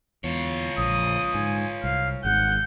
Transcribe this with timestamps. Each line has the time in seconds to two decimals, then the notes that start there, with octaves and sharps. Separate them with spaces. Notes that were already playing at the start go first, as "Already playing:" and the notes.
0.24 E2 F4 C#5
0.78 A#1 D#6
1.34 G#2 G#5
1.84 C2 F5
2.25 G#1 G#2 F#5 G6